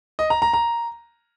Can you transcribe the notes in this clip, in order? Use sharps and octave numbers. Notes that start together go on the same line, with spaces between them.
D#5
A#5
A#5
A#5